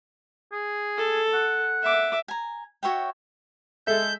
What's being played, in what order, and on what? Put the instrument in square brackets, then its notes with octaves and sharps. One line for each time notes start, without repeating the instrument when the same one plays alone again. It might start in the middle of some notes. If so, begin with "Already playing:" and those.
[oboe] G#4
[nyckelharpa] A4
[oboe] F#5
[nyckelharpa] E5 D6
[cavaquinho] G#5 A#5
F#4 C#5 E5 G5
[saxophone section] G#3 A4 [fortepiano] E5 [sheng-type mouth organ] G6